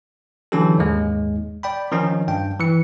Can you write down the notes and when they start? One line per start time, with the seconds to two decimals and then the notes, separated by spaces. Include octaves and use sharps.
0.52 D3 E3 F#3 C#4 G4 A4
0.78 D#2 G#2 G#3
1.63 D5 G5 B5
1.92 D#3 F3 C#4 D#4
2.28 G2 G5
2.59 E3 C#7